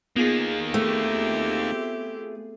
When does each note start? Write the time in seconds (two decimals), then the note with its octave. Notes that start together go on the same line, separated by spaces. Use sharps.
0.16 D#3 A#3 B3 F4 G#4
0.74 A3 C4 E4 G4